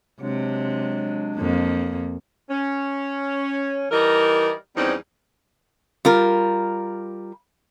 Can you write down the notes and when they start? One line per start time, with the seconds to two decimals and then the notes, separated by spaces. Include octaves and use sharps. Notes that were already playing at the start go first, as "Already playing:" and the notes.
0.21 C3 F#3 G#3 D4
1.36 F2 A#3
2.50 C#4
3.91 E3 G3 D#4 A#4
4.76 E2 F3 G3 C4 C#4 D#4
6.05 G3 F4 A#4